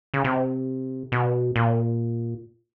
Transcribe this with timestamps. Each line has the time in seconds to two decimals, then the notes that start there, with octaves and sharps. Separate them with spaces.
0.14 C#3
0.24 C3
1.12 B2
1.56 A#2